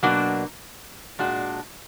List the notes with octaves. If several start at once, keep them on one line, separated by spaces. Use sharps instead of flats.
B2 F#3 A#3 D4 F#4
A#2 G#3 D4 F#4